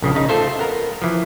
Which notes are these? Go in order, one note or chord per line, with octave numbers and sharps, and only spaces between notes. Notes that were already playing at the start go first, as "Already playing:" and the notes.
A#1 C#3 F3
C#3 D#4
A3 F4 A4 C5 E5
B3 A#4
E3 F3